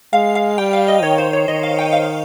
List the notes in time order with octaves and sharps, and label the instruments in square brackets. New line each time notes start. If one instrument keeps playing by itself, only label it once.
[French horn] G#3 [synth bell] F5
[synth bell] F5
[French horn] G3 [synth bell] G5
[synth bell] F5
D#5
[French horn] D#3 [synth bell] C#5
[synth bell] C5
C#5
[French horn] D#3 [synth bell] D#5
[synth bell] F5
G5
F5